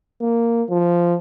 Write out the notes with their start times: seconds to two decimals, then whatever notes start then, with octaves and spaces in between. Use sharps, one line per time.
0.21 A#3
0.70 F3